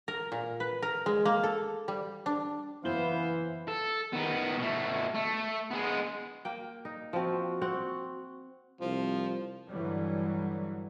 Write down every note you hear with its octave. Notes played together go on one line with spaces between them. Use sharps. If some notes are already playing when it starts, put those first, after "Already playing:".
A#4
A#2
B4
A#4
G#3
A#3
A4
G3
D4
F#1 E3 B3 E4 C5 F5 G7
A4
D#3 B3
B2 A3
A3
G#3 B3
A#3 G5
D#4
F3 C4 F#4
C4 F#5
C2 F3
G2 D3 E3 F#3 G3